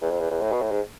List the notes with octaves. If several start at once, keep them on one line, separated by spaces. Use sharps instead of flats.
E2
F2
E2
E2
A2
B2
A2
G#2